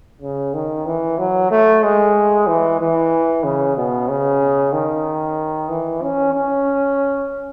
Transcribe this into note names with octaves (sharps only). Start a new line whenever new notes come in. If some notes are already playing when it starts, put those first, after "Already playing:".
C#3
D#3
E3
F#3
A3
G#3
E3
E3
C#3
B2
C#3
D#3
E3
C#4
C#4